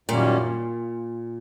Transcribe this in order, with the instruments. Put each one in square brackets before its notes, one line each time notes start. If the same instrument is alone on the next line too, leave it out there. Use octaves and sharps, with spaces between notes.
[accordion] F#2 D#3 G3 A#3 C#4 [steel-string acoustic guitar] A#2